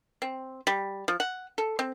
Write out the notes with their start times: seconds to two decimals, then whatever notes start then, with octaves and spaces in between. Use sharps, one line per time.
0.22 C4
0.67 G3
1.08 F3
1.20 F#5
1.58 A4
1.79 C4